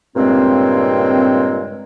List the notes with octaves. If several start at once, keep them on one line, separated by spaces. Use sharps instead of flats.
G2 A#2 C#3 G#3 C4